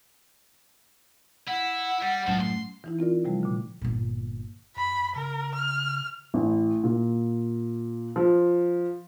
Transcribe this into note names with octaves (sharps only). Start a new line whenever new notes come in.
E4 F#5
G3
F#2 A2 F3 A4
C6
E3 D#4 E4
C4 F4 A#4 D5
C3 F3 G3 A3
A#2 D3
G1 A#2
F#2 B5
C#3 A#4
F6
A1
A#2
F3